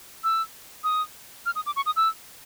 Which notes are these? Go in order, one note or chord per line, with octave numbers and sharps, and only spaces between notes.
E6
D#6
F6
D#6
D6
C#6
D#6
E6